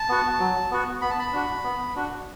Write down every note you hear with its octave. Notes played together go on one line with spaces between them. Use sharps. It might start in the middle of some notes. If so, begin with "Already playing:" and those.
Already playing: A5
B3 F#4
F#3
B3 F#4
B3 B5
A5
B5
D4 F#4
B3
D4 F#4